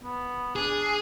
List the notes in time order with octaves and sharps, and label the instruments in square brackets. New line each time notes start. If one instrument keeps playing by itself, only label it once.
[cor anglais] B3
[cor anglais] D4 [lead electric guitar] G#4